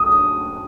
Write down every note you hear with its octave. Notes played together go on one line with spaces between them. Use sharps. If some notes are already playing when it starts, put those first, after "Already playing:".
Already playing: D#6